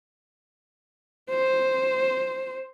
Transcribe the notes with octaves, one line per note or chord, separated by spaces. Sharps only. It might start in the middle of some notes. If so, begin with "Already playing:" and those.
C5